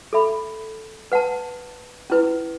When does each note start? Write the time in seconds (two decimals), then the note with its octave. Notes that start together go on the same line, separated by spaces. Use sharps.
0.13 A4 E5 B5
1.12 B4 F#5 A5
2.10 C#4 E4 B4